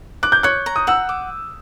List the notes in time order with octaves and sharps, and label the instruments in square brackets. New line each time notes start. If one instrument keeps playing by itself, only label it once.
[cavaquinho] D6 [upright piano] F#6
[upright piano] G6
[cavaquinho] C#5 [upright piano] F#6
[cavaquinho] A#5
[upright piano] D#6
[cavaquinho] F#5 [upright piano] E6
[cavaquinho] D6